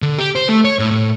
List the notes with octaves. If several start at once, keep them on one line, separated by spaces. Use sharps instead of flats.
D3
G4
C5
A3
C#5
A2
A2